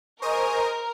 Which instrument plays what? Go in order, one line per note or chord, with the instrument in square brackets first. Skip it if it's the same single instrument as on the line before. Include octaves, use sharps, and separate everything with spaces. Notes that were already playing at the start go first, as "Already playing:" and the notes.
[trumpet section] G#4 G#5 C#6 [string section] A#4 [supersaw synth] C5 D#5 D#6